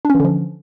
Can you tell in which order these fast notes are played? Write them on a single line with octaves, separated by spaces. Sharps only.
D4 C#4 E3 D3 F3